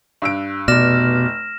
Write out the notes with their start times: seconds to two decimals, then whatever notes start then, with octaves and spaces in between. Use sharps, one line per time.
0.22 G2 E6 D7
0.68 F1 B2 D5 F6 A#6 E7